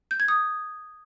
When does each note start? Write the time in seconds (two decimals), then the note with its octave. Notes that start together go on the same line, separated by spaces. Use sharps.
0.11 G6
0.20 G#6
0.28 D#6